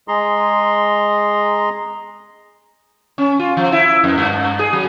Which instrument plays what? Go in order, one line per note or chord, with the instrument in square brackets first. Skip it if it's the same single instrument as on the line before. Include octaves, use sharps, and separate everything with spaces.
[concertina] G#3 G#4 A#5 C6
[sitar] C#4
F4
F3
E4
F2
G2
G#4
F#3